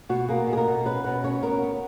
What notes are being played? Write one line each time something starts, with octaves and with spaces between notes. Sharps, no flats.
B2 F#4
A#3 G#4
B2
G#4
A#4
B2
C#4 B4
B2 B4
C#4 C#5
B3 A#4
B3